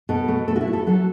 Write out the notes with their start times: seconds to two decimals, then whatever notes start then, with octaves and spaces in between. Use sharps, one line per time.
0.09 B2 A4
0.28 A3
0.48 A3 A4
0.56 F#4
0.61 E4
0.68 A3
0.73 A4
0.87 F#3 A4